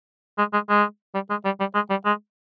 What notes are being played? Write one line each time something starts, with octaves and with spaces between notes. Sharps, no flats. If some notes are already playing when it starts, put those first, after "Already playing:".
G#3
G#3
G#3
G3
G#3
G3
G3
G#3
G3
G#3